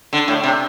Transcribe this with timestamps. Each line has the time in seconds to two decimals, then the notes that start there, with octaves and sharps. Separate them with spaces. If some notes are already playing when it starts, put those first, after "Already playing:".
0.13 D3
0.28 A2
0.43 C3